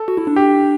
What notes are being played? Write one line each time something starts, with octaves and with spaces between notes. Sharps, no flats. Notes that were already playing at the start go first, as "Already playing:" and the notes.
Already playing: A4
F#4
E4
D4
G4